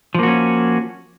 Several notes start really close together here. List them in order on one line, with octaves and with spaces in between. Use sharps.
F3 A#3 F#4 C#4